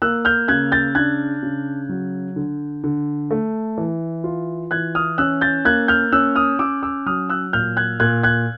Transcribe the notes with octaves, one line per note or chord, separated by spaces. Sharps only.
A#3 E6 F#6
F6 G6
C#3 F#6 G#6
G6 A6
D4 F#6 G#6
C#3
F#3
D3
D3
A3
E3
F4
E3 F#6 G#6
D#6 F6
C#4 E6 F#6
G6 A6
A#3 F#6 G#6
F6 G6
C#4 E6 F#6
D#6 F6
C#4 D6 E6
D6 E6
F#3 D#6 F6
E6 F#6
A#2 F6 G6
F#6 G#6
A#2 F#6 G#6
F#6 G#6